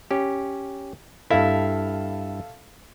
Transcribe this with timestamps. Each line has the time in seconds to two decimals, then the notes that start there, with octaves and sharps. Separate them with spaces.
0.11 C#4 G4
1.31 G2 E4 A4 E5 F5